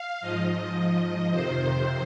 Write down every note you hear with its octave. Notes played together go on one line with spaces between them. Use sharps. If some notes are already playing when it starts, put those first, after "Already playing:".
Already playing: F5
G#2 F3 D#5
F2 C3 D#3 C5